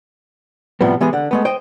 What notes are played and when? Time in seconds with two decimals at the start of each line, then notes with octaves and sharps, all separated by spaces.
0.81 A2 C3 F3 G3 B3
1.01 E3 G#3 B3 G4 G#4
1.13 D3 F#5
1.31 G#3 A3 B3
1.45 C5 D#5 G5